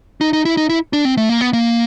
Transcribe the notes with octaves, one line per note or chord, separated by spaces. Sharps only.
D#4
D#4
E4
D#4
E4
D4
C4
A3
A#3
B3
A#3